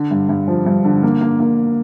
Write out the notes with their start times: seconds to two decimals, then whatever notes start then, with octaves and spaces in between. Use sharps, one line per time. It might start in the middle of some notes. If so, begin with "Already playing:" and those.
Already playing: D3
0.11 G2
0.29 G2
0.48 F3
0.66 G2
0.84 D3
1.03 A#3
1.21 A#3
1.40 A#3